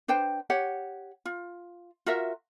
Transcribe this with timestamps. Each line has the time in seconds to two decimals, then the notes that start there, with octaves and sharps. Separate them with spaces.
0.08 D4 B4 C5 G5
0.50 G4 C#5 F#5
1.25 F4
2.06 F4 F#4 A#4 E5